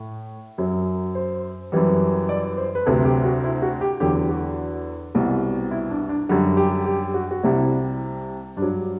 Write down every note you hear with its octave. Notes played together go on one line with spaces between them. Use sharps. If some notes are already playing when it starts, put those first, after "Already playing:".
Already playing: A2
F#2 F#3
C5
F#2 E3 G3
D5
C5
B4
D2 C3 F#3 A4
G4
F#4
E4
F#4
G4
E2 D3 F#3 G4
F#4
C2 B2 G3
E4
D4
D4
F#2 D3 G3 F#4
G4
G4
F#4
F#4
C2 C3 G3 E4
G2 D4
F#3